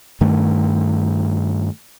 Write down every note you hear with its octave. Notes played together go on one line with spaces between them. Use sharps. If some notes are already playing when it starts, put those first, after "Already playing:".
G2 D#3 A3